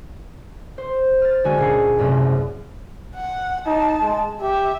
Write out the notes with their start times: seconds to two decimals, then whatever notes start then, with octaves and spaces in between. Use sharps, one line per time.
0.78 C5
1.22 F6 A6
1.44 D3 G#3 F#4 G#5 F6
1.57 C#2 A#2 G#4 C7 C#7
1.98 C2 F#2 A2 C3
3.15 F#5
3.66 D#4 A5
4.01 G#3
4.41 G4 E5